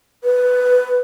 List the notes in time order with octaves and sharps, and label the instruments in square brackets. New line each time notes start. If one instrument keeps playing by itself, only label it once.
[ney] B4